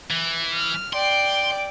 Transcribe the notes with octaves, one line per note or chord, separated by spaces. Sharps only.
E3
F6
D5 G5 C6